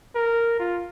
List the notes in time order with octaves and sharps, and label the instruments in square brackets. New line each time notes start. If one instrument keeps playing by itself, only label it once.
[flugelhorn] A#4
F4